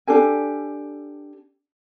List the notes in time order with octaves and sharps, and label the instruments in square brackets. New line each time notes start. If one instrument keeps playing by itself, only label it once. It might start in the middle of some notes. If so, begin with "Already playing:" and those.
[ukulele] D4 G4 A4 G#5